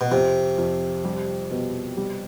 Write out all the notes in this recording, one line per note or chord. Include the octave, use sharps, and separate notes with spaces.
B2
F2 C3
F2
G3
B2
G3